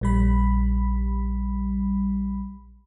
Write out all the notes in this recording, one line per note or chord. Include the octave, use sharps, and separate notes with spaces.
A#1 G3 B5